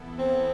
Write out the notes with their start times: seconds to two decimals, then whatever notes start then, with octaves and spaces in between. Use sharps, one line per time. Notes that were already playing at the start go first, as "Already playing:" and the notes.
Already playing: E3 B3 E4 A4
0.19 C4